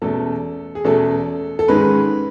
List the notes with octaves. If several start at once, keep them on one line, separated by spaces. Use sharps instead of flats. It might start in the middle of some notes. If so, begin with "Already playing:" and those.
E2 B2 A3 C#4 A4
G#4
E2 B2 A3 C#4 A4
A4
G#2 D#3 G#3 C#4 B4